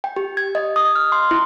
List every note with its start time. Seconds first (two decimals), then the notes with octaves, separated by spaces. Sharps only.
0.04 G5
0.16 G4
0.37 G#6
0.55 D#5
0.76 D#6
0.96 F6
1.12 C6
1.31 E4